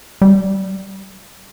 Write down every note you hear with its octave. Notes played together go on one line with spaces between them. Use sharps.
G3